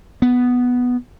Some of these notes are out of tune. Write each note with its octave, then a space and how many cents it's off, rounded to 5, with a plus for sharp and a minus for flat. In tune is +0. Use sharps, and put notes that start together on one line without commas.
B3 +0